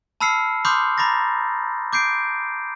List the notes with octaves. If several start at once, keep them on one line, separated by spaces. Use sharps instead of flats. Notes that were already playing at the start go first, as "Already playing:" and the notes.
A5 B5 E6 F6 C7 C#7
B5 C6 D6 D#6 F6 G6
A#5 B5 D6 A6 A#6
D6 G6 C7 D7